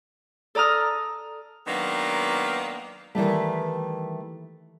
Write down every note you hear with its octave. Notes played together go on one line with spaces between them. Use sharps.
A4 D5 A#5 D#6 F6
D#3 F#3 G#3 A#3 B3 D4
D#3 E3 G3 A3